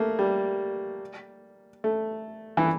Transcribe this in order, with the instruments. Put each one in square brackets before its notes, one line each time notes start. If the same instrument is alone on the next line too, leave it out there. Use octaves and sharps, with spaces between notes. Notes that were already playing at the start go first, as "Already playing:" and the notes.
Already playing: [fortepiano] A3 A#3
G3
A3
E3